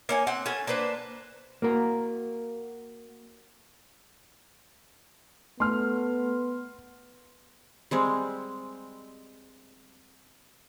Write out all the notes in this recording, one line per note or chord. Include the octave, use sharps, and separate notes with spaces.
A#3 C#5 G#5
C4 F#5
C#4 A4 G#5
A#3 D4 B4 C5
A#3 F#4 A#4
A3 B3 C6 F6
G3 G#3 C4